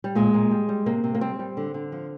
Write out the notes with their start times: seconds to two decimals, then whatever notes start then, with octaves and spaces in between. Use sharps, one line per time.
0.04 G3
0.15 A#2 G#3
0.34 A#2
0.51 G3
0.69 G3
0.86 C3 A#3
1.04 C3
1.15 A#3
1.21 G3 C4
1.39 G3
1.57 D3
1.74 D3
1.92 F3